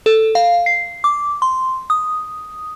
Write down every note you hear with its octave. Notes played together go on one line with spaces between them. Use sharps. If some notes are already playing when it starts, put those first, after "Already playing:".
A4
F5
C7
D6
C6
D#6